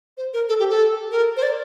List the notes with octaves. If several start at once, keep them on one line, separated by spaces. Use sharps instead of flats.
C5
A#4
A4
G4
A4
A#4
C5
D5